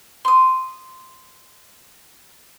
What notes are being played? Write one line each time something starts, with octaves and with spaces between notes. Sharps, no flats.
C6 D#6